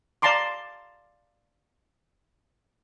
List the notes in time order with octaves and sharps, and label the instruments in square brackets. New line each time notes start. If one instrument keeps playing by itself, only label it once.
[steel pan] D5 F5 A5 A#5 C6 D6